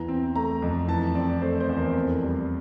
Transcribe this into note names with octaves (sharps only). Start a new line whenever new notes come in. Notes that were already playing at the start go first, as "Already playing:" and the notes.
Already playing: E2 E3 A#5
C4
A3 A#5
F2
E3 A5
C4 D5
A3 C5
C5
E2
A#4
F2
G3